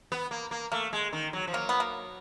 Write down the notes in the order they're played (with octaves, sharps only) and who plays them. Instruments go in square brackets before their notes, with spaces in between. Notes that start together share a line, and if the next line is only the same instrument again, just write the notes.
[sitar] B3
A#3
A#3
[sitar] A3 [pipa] A#3
[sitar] G#3
D#3
F#3
F3
[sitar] F#3 [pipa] A#3
[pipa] B3
A#3